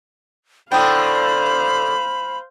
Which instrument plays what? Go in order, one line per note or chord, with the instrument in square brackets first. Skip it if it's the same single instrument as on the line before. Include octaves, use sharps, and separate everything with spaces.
[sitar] A2 D3 D4 [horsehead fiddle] C5 F5 [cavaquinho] G5 D#6 [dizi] B5